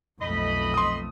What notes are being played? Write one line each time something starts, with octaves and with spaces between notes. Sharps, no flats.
B1 F2 A3 D#5 B5
C6 D#6